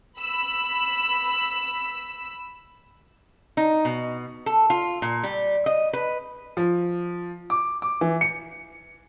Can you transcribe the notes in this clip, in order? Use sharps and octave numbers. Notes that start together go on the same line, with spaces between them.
B5 E6
D#4
B2
A4
F4
A#2
G3
D#5
B4
F3
D6
D6
E3
C#7